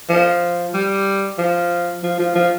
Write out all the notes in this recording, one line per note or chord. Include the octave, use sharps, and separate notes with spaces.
F3
G3
F3
F3
F3
F3